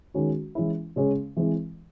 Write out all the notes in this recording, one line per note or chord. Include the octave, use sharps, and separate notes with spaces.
D#3 G#3 C#4 F#4
E3 G#3 C#4 E4
C#3 G#3 C#4 G#4
E3 G#3 C4 E4